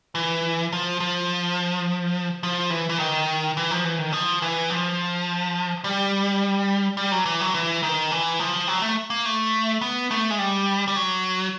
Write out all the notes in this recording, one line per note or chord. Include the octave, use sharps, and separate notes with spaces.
E3
F3
F3
F3
E3
E3
D#3
E3
F3
E3
D#3
F3
E3
F3
G3
G3
F#3
E3
F#3
E3
D#3
E3
F3
F#3
A3
A#3
A3
B3
A3
G#3
G3
G3
F#3